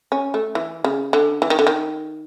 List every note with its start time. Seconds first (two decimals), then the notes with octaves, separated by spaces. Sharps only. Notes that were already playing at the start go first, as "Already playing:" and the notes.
0.12 C#4
0.34 A3
0.55 E3
0.84 C#3
1.13 D3
1.42 E3
1.50 D#3
1.59 D3
1.67 D#3